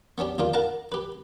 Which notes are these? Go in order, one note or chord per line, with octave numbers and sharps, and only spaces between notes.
B3 C#4 D4 G4
D#2 D#3 D4 F4
A#4 F5 F#5 A5 A#5
G4 B4